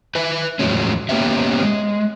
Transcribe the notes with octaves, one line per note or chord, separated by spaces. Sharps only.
B4 E5 G#5
E2 A2 F3 F#3 G#3 C#4
A#3 B3 C#4 G4 E5
G#3